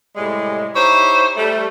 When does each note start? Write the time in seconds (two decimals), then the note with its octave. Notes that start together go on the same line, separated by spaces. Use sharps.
0.16 A2 C3 G3 G#3
0.75 D#4 E4 G4 C5 C#5
1.36 G3 A3